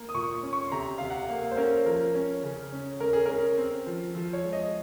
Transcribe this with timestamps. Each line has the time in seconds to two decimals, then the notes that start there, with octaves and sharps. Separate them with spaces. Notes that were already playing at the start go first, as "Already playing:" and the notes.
Already playing: A#3
0.09 D#6
0.14 A#2 C#6
0.43 C#4
0.53 C#6
0.68 C6
0.72 C3 A#5
0.98 C3 F5
1.10 F#5
1.29 A#3 F5
1.51 C5
1.57 C#4 A#4
1.86 F3 A#4
2.14 C#4
2.43 C#3
2.72 C#4
3.00 C#4 A#4
3.13 G#4
3.26 C#4 A#4
3.58 C4
3.86 F3
4.15 F3
4.33 C#5
4.43 G#3
4.53 D#5